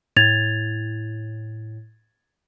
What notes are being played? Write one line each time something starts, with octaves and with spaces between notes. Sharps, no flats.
A2 G#6 A6 F7